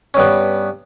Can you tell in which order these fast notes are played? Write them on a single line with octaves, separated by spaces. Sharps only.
C#4 G2 B3